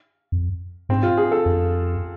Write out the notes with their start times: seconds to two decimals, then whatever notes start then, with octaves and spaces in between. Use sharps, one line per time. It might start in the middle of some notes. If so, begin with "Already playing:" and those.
0.32 F2
0.89 G#2 C4
1.03 F4
1.17 G#4
1.32 A4
1.46 F2